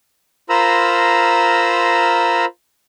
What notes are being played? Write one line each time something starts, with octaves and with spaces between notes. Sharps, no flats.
F4 A#4 C5 A#5 B5 E6